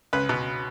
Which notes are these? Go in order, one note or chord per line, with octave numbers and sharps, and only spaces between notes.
C#2 B4
B2